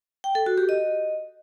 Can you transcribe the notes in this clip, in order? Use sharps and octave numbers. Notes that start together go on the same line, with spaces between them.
G5
A4
F#4
G4
D#5